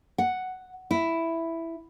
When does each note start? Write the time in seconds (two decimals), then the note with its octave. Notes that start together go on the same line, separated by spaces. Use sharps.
0.18 F#5
0.91 E4